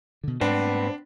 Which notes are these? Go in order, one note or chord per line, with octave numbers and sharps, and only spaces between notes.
B2 D3
G#2 G3 A3 B3 C4 D4